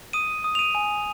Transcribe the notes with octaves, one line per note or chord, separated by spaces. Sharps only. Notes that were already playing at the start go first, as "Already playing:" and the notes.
D#6 D#7
D#6
F7
D#7
G#5